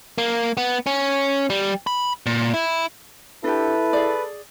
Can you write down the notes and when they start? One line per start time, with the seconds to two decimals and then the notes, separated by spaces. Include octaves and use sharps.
0.18 A#3
0.57 B3
0.86 C#4
1.50 G3
1.87 B5
2.26 A#2
2.54 E4
3.44 D4 E4 G4 A4 B4
3.93 G#4 D5